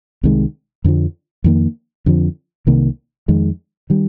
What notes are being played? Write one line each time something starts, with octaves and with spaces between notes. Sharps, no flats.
C2 C3 D#3 G#3
F2 D3 F3
F2 D#3 A#3
F2 D3 F3
C2 C3 D#3 A#3
F2 D#3 G#3
D#3 G3